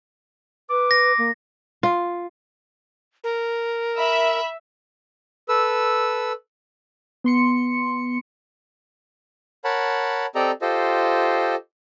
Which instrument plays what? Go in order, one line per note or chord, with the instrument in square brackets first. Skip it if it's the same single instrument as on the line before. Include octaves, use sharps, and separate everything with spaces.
[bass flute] B4 [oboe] D6
[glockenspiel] A#6
[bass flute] A#3
[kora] F4
[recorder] A#4
[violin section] E5 [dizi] B5
[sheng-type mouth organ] A4 B4 E6
[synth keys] B3 C6 C#7
[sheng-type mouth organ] A#4 C#5 F#5 A5 B5
C4 G4 A4 D5 D#5 A#5
F4 G4 A4 C5 D#5